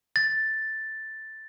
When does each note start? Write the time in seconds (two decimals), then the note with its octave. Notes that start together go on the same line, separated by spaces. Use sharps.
0.16 A6